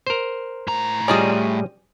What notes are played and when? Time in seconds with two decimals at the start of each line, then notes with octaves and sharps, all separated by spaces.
0.07 A#4 C5
0.68 A2 A#5
1.08 G3 C#4 F4 G#4 D5 D#5